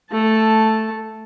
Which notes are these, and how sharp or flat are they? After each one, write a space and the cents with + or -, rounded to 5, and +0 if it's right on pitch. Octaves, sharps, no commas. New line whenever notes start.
A3 +0 A5 +0